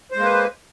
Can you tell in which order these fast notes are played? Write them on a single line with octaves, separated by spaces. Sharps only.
C5 G#3 A#3 B4